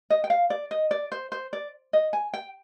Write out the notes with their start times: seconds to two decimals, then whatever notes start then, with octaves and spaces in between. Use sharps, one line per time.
0.10 D#5
0.24 G5
0.30 F5
0.50 D5
0.71 D#5
0.91 D5
1.12 C5
1.32 C5
1.53 D5
1.93 D#5
2.13 G#5
2.34 G5